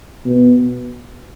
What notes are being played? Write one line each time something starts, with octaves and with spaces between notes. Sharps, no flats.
B2